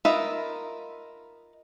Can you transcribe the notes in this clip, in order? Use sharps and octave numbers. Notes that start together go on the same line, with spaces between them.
D#4 F4 A#4 B4 E5